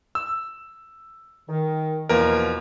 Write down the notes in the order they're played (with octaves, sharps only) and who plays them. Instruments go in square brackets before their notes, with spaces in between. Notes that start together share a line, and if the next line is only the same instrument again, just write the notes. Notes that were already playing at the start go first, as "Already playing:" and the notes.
[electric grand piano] E6
[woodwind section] D#3
[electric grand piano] E2 A#4 [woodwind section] B2 F3 A#3